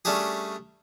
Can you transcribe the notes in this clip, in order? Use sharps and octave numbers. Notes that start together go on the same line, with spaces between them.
G3 A3 C#4 D4 G4 G#4